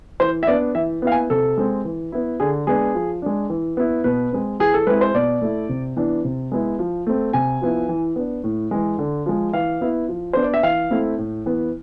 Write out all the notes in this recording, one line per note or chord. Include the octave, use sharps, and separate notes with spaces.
E3 C5
E5
B3 D4 D5
E3 E5
B3 E4 F5
G#5
C3 A4
G#3 C4
E3
B3 E4
D3 G#4
G#3 B3 D4 G#4
F3
G#3 D4
E3
B3 E4
B2 B4
G#3 C4
E3 G#4
A4
G#3 C4 E4 B4
C5
B2 D5
A3 E4
C3
E3 B3 D4
C3
G#3 B3 E4
F3
A3 C4
C3 G#5
F3 B3 E4
E3
B3 D4
A2
E3 G#3
D3
F3 G#3
E3 F5
B3 E4
F3
B3 D4 C5
D5
E5
E3 F5
A3 C4 E4
A2
E3 B3